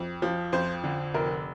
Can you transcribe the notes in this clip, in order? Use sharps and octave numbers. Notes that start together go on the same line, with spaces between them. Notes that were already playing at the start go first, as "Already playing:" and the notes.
Already playing: F2
F3
F2 C5
D3
F1 A#4